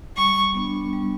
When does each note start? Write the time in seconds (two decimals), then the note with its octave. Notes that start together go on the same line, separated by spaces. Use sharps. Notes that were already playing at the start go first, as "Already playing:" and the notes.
0.17 G3 C#6
0.54 B3 D4
0.93 G3